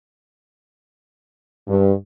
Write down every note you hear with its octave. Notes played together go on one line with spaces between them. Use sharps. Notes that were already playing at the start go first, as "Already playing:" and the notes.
G2